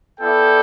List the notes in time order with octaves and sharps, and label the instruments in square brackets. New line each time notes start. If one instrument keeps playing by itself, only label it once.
[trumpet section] B3 E4 A4 D5 G5